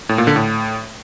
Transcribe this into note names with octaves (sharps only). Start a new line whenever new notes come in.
A2
A#2
D3
A2